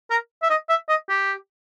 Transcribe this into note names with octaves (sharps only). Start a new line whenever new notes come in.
A#4
E5
D#5
E5
D#5
G4